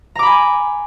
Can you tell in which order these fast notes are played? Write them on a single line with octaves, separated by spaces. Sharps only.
A#5 D6 B5 G#5